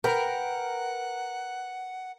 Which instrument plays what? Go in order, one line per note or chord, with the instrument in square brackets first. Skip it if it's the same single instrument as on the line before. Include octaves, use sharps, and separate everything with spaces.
[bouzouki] A#4 [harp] B4 G5 [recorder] F#5